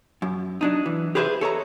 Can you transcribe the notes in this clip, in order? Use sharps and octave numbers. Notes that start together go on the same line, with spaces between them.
F#2
F#3 D4 D#4
E3
G4 G#4 B4 C5 E5
A4 C#5 D#5 A#5